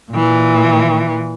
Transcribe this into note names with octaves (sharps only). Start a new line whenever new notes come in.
A#2 E3